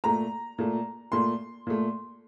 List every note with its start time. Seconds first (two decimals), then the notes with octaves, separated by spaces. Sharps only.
0.04 A#2 A3 A#5
0.58 A#2 A3
1.12 A#2 A3 C6
1.67 A#2 A3